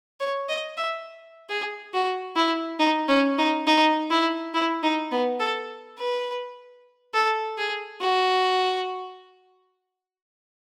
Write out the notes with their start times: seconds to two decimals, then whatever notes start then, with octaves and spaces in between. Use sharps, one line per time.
0.20 C#5
0.49 D#5
0.77 E5
1.50 G#4
1.93 F#4
2.36 E4
2.79 D#4
3.09 C#4
3.38 D#4
3.67 D#4
4.11 E4
4.54 E4
4.83 D#4
5.11 B3
5.40 A4
5.98 B4
7.14 A4
7.58 G#4
8.01 F#4